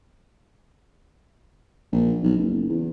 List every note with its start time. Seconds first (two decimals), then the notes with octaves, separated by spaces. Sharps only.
1.92 A#1
2.23 B1
2.37 F#1
2.69 E2